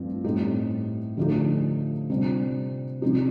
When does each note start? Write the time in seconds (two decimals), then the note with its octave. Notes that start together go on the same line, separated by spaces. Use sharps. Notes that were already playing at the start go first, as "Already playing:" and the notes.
Already playing: G2 F3 A3 C4
0.24 A2 G3 C4 D#4
1.17 D3 F3 A3 D#4
2.10 C3 G3 D4 F4
3.02 C3 F3 C4 D#4